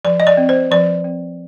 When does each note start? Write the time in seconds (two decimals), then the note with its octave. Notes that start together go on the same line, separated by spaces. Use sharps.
0.05 F3 D5
0.20 D#5
0.27 D5
0.37 C4
0.49 C5
0.71 F3 D5
1.04 C4